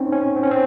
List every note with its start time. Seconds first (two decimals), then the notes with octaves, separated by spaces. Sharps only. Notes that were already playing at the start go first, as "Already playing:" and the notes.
Already playing: C4 C#4 D#4
0.12 C#4
0.36 C4
0.43 C#4
0.51 C4